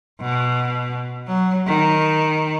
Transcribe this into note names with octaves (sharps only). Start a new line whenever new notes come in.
B2
F#3
D#3